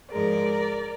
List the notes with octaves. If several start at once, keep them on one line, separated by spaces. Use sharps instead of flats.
G#2 F3 G#3 A#4 D5